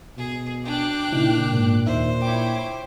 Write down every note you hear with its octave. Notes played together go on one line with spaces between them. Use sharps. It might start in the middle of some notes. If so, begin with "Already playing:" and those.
B2 G#4
D4 G5 D6 F#6
A#2 C#3 D#4 E4
G#2 B2 A#3
D#2 D#4 C5 E5
E4 C#5 G5 D6